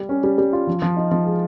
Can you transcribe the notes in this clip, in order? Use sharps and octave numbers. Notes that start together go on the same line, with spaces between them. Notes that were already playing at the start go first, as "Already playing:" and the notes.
Already playing: G3 G4
C#4
G3
G3
F4
F3
F3
D#4
F3
G#3